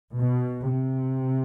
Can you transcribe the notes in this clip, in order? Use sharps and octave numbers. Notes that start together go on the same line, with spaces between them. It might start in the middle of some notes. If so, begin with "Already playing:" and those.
B2
C3